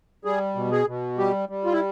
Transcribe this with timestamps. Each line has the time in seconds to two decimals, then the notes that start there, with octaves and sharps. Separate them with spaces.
0.25 G3 G#4
0.55 B2
0.72 G#4
0.87 B2
1.18 G3 G4
1.49 G3
1.65 F4
1.73 E4